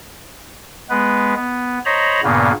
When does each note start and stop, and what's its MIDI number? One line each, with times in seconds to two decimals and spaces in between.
0.90 1.34 56
0.90 1.34 59
0.90 1.34 71
1.36 1.79 59
1.85 2.21 72
1.85 2.21 73
1.85 2.21 75
1.85 2.21 82
1.85 2.21 83
2.24 2.52 43
2.24 2.52 46
2.24 2.52 49
2.24 2.52 58
2.24 2.52 59